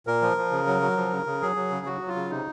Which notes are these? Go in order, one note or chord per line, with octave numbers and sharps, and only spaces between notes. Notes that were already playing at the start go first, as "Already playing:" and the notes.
A#2 A#4
F3
F3
C#3
F#3
F#3
F3
C#3
C#3
F#3 G#4
F#3
C#3
F#3 F#4
F#3
F4
C#3
C3 D#4